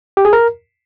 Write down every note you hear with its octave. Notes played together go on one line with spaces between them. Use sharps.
G4
G#4
A#4